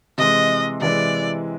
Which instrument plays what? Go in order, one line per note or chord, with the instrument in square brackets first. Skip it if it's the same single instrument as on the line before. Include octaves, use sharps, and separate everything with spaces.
[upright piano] C3 E3 G#3 [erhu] D#5
[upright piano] C3 E3 G#3 [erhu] D5